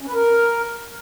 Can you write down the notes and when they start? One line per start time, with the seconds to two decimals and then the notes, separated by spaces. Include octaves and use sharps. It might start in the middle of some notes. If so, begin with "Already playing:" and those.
0.01 C#4
0.08 B4
0.14 A#4